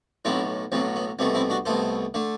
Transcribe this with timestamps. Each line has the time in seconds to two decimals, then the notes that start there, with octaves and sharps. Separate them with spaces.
0.25 B1 A2 F#3 C4 E4
0.72 B1 A2 F#3 C4
0.96 B3
1.19 C2 B2 A3 C4
1.35 C4 E4
1.50 D4 F#4
1.65 C2 B2 A3 A4 C5
2.14 D3 A3